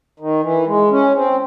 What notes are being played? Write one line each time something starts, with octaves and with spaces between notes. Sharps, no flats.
D#3
E3
G#3
C#4
C4